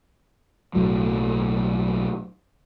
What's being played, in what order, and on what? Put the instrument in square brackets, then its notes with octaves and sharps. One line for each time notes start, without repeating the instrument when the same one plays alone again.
[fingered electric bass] B1 A2 F#3